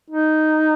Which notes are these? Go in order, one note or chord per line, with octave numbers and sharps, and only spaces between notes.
D#4